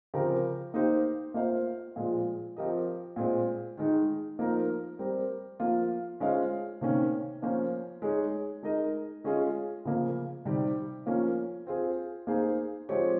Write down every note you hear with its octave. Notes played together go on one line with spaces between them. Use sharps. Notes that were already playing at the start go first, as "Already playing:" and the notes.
C#3 F3 C4 G4 A#4
A#3 D#4 G4 C5
A#3 F4 C5 F5
A#2 F3 G#3
F3 C4 G4 A#4 D#5
A#2 G#3 C4
D#3 G#3 D#4
F3 A#3 D#4 A#4
G3 C4 G4 A#4
F3 A#3 F4
G#3 C#4 F4 C5 F5
C3 D#3 A#3 C#4
F3 A#3 C#4 F4 C5
G#3 D#4 G#4 C#5
G#3 D#4 A#4 D#5
G#3 C#4 F4 G#4 D#5
C#3 F3 A#3
C3 D#3 G3 C4 G4
F3 A#3 C#4 F4
C4 F4 G#4 C5
A#3 D#4 G#4 C5
F3 G#3 C4 G4 C#5